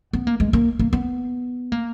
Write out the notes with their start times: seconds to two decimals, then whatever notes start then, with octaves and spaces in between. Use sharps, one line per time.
0.13 B3
0.27 A#3
0.40 G#3
0.53 A#3
0.79 A#3
0.93 B3
1.72 A#3